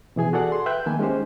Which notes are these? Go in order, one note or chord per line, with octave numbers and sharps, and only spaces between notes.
B2 E3 G#4 G#5
F#4 G#4 A4 D5 F#5
C6
B4 E5 G5 F#6 G6
D#3 A#3 G#5
G#3 C#4 D#4 G4 C5